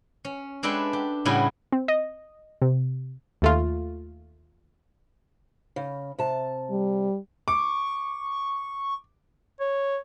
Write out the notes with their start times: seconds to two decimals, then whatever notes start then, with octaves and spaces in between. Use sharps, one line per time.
0.25 C#4
0.63 G#3 D4 A4 B4 E5 G5
0.93 G4
1.25 A2 C#3 G3 C#4 E4 F#4
1.72 C4
1.88 D#5
2.62 C3
3.42 D#2 A3 F4
5.76 C#3
6.19 C3 A5
6.70 G3
7.48 C#6 D6
9.60 C#5